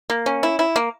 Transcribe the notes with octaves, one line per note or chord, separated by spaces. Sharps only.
A#3
C#4
E4
E4
A#3